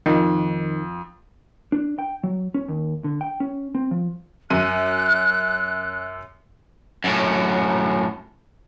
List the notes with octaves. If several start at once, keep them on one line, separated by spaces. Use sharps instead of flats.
F2 D#3
D4
G5
F#3
C#4
D#2
D3
G5
C#4
C4
F3
F#2 F#6 D#7
F#2 A2